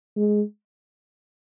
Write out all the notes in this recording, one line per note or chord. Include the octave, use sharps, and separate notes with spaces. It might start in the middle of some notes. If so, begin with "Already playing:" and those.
G#3